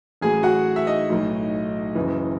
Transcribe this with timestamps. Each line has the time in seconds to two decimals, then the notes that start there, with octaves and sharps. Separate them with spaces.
0.21 A1 A2 F#3 G#4 G#5
0.43 F#4 F#5
0.76 E5
0.87 D#4 D#5
1.09 B1 A2 F#3
1.95 F#1 F#2 E3